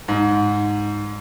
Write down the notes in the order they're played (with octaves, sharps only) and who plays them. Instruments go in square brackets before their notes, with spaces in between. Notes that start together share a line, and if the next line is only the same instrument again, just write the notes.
[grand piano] G#2